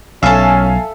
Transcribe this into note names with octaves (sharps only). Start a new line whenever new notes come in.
B1 C#4 A4 E5 F5 G#5 A5